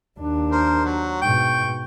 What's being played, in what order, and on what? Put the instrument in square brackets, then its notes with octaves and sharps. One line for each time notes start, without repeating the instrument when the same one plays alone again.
[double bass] D#2 D4
[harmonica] A#4 C5
F#3
[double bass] G#2 B2 [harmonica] G5 C#6